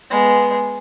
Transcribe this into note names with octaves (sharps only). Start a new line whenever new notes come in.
G#3 B3